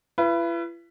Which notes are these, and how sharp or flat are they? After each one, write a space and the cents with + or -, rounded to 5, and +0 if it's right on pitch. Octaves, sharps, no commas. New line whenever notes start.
E4 +45 B4 +0